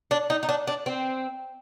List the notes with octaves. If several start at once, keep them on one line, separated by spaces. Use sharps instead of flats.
D4
D#4
D#4
D4
D4
C4